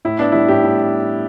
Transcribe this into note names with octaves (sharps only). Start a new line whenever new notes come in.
A2 E4
B3 D4
G3 E4
A2 G4
A2